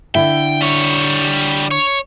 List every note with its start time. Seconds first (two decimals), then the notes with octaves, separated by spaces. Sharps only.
0.15 D3 E4 E5 G5
0.61 G3 C#5
1.71 C#5